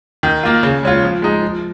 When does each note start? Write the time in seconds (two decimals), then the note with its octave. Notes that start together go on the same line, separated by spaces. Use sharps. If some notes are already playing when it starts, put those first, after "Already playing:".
0.23 D#3
0.43 A#3 F4
0.63 C#3
0.83 G#3 C#4 F4
1.03 F3
1.22 G#3 D#4
1.43 F3